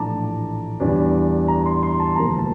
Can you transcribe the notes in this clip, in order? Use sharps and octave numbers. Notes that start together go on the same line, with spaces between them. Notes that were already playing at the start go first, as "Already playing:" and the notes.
Already playing: A#1 A2 E3 A3 D4 A5 A#5 D6
E2 E3 G3 D4
A#5
C6
C6
A5
E1 D2 D3 F3 A#3 A#5
A5